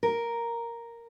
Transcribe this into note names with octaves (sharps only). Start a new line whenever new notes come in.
A#4